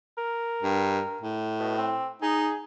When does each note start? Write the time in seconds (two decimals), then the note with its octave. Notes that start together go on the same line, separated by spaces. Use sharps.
0.18 A#4
0.62 G2
1.21 A2
1.59 B2
1.78 C4
2.22 D#4 G#4